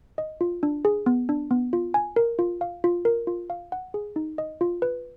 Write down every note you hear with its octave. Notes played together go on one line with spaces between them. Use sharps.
D#5
F4
D4
G#4
B3
D4
B3
F4
G#5
A#4
F4
F5
F4
A#4
F4
F5
F#5
G#4
D#4
D#5
F4
B4